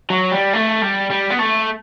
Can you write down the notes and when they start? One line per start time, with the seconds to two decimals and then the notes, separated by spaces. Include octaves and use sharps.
0.10 F#3
0.32 G3
0.53 A3
0.82 G3
1.10 G3
1.30 B3
1.39 A3